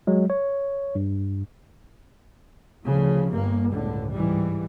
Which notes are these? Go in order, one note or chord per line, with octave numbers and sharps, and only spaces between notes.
F#3 G#3
C#5
G2
D2 C#3 F3
G1 G2 A#3
G1 C#2 A2 D3
G#2 E3 G3